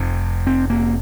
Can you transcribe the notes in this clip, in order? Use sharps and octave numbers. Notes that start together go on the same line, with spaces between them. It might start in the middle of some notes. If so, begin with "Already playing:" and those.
Already playing: F1 F2 C3
C4
A#3